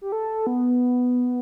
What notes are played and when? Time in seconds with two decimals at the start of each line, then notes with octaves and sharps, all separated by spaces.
0.02 G4
0.12 A4
0.47 B3